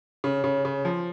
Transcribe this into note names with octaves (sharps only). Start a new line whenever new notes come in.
C#3
C#3
C#3
F3